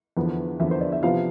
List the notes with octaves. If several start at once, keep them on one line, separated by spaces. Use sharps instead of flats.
E2 D3 F3 B3
E2 D3 F3 B3 E5
C5
D5
E5
C3 F3 B3 F4 F5